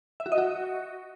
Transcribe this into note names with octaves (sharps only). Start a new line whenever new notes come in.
E5
F#4
D#5
F#4